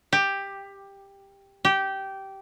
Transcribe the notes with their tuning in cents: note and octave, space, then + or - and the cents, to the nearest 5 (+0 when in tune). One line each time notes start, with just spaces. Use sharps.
G4 +10
G4 -15